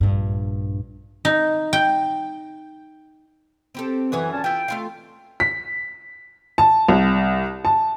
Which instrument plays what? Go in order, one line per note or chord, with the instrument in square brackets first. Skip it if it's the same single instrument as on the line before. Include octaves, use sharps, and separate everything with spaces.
[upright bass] A#1 G2
[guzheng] D#4
G5
[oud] C4 G4 A4
[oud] F#2 G#4 C#5 [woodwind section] E3
[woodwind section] A#2 C#4 A5
[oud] E4 F4 [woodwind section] G5
[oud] A3 F4 F5
[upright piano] B6
A5
C2
A5